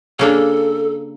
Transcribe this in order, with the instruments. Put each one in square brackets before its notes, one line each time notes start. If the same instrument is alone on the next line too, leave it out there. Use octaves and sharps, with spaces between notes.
[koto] C#3 A#3 D4 [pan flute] A4